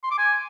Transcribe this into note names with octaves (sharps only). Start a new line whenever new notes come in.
C6
D6
G#5